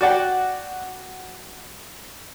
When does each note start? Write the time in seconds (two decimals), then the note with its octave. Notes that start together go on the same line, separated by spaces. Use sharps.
0.01 F#4 D5 F#5 G5